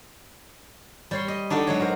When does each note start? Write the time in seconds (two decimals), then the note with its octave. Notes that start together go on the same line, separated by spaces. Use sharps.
1.11 G3 C#5 C6
1.28 D#5
1.50 D4 D#4 F#4 A4 D5
1.67 F#3 G#3 C#5
1.80 F#4 A#4 C5